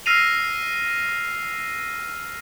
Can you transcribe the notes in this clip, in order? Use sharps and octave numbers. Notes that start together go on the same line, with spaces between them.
E6 F6 A#6 C7 D#7 F7